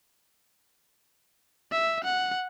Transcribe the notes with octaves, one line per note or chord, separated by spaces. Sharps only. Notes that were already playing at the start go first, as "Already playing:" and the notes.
E5
F#5